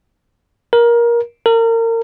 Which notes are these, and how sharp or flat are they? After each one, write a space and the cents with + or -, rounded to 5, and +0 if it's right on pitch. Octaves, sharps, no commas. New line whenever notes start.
A#4 +20
A#4 -30